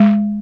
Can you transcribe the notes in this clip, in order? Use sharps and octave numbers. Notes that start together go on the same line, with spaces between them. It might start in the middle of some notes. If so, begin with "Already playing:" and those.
Already playing: G#3